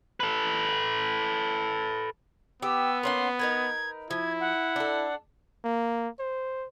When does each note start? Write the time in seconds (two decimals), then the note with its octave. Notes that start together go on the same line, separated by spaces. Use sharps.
0.20 A4 B4
2.62 B3 G4 E6
3.03 A#3 C#4 F#5 C6
3.39 D#4 A#4 B4 G#6
4.11 F3 E4 G#6
4.40 F#5
4.76 D4 A4
5.64 A#3
6.20 C5